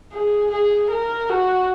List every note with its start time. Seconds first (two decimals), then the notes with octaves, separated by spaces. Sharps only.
0.13 G#4
0.52 G#4
0.91 A#4
1.30 F#4